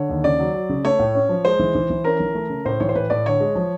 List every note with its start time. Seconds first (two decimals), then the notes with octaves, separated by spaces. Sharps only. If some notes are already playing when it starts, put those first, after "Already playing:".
Already playing: D3 C#5
0.10 D#2
0.24 C#3 D5
0.39 F#3
0.54 F#3
0.69 C#3
0.84 A3 C#5
0.99 A2
1.15 C#4
1.29 F3
1.45 G#3 C5
1.59 E3
1.75 E3
1.90 E3
2.04 C#4 A#4
2.20 E3
2.35 A3
2.50 C#3
2.65 A2 C5
2.80 E3 C#5
2.89 C5
2.95 A2 B4
3.10 A2 D5
3.26 D3 C#5
3.40 G#3
3.55 F3